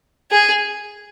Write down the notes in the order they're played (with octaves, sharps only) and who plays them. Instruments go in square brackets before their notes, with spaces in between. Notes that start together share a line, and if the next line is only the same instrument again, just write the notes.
[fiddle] G#4